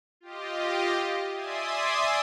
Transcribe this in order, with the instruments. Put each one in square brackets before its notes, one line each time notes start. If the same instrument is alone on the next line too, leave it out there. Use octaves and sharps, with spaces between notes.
[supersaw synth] F4 G4 D#5
D5 E5 G#5 C6 D#6